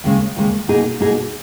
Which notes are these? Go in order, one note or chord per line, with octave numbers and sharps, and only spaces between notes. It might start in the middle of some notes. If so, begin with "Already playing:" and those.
D#2 C#3 G#3
D#2 C#3 G#3
B2 A#3 D#4 G#4
B2 A#3 D#4 G#4